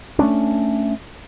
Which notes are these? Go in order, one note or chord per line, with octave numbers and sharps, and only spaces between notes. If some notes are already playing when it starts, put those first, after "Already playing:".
A3 B3 C#4 D4